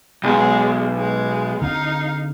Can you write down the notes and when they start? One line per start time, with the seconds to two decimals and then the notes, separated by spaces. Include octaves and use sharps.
0.24 B1 G#3
0.97 G#3
1.62 D3 C4 D#4 F5